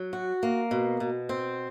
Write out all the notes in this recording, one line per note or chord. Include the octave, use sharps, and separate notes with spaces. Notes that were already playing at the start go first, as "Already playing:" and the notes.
Already playing: F#3
F#4
A#3
B2
B2
C4